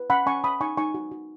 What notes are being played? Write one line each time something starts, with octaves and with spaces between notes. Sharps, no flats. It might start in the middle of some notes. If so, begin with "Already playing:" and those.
Already playing: B4
C#4 F#5 B5
C#4 G#5 C#6
C#5 B5 D#6
D#4 G#5 C#6
D#4 G#5 C#6
F#4
F#4